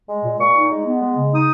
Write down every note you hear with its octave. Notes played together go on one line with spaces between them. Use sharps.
G#3
A#2
A#2 C#6
D#4
G#3
B3
G#3
C#3
D#4 D#6